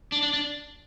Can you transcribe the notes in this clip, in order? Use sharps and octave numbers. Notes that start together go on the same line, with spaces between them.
D4
D4
D4